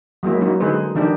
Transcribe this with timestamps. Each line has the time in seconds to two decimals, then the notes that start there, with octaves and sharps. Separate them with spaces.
0.23 F#3 G#3 A#3 E4
0.41 F#3 C#4 D#4
0.60 D3 G#3 D#4 G#4 B4 C5
0.95 D#3 F3 D4 D#4 G4